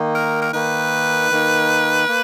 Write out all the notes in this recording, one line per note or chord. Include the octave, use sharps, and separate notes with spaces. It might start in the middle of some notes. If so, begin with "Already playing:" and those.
Already playing: D#3 A#3 D#4
A#4
A#4
D#3 A#3 D#4 B4
D#3 A#3 D#4
A#3